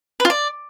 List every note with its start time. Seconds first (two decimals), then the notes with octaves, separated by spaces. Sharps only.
0.20 B4
0.25 F4
0.30 D5